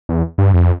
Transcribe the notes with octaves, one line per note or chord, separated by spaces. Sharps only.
E2
G2
F2